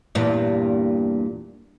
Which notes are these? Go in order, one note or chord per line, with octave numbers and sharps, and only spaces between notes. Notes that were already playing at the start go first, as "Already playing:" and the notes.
E2 G2 A#2